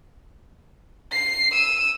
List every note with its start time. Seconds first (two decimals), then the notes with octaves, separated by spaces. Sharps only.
1.12 C7
1.52 E6 D#7